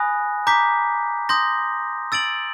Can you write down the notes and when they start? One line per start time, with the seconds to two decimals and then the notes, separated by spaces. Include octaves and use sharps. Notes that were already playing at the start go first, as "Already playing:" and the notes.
Already playing: G#5 B5 D#6 F#6 A#6
0.47 A#5 D6 G6 B6
1.29 C6 D#6 G6 A#6
2.12 E6 A6 D7 F#7